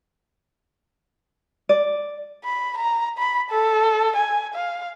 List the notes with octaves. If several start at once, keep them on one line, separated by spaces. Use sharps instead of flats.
D5
B5
A#5
B5
A4
G#5
F5